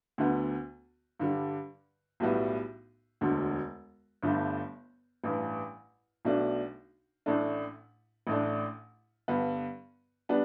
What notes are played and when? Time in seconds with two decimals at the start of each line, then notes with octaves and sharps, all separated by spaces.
0.18 D2 D3 B3
1.20 G2 D3 G3
2.20 B1 A2 G3 B3 E4
3.21 E1 D2 D3
4.23 G1 G2 D3 A3
5.24 A1 G2 E3
6.25 B1 B2 A3 D4
7.26 A1 A2 A3 D4
8.27 A1 A2 A3 D4
9.28 G2 D3 B3
10.29 G3 B3 D4